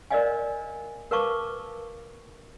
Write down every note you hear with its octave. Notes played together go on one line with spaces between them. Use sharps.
A#4 C5 D5 D#5 F5 G#5
A#4 B4 F5 A5 C#6 D6